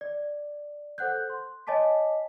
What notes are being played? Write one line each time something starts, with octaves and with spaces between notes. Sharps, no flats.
D5
A4 C5 F#5 F#6 G6
C6
C#5 D#5 G#5 A5 D6 B6